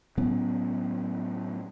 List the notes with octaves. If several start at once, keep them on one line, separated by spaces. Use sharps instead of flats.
A2 F#3 B3 C#4